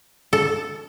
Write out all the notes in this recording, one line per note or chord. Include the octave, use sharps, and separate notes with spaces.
A4